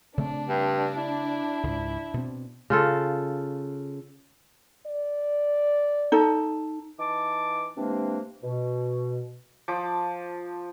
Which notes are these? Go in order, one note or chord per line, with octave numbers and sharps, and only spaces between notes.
C#3 A3 C4 D4
G2
E4
C#2 G#2
B2 C4
C#3 F4 A4
D5
D#4 A4
E3 D#4 A5 D6
C3 E3 G#3 A#3 C4 D4
B2
F3 D6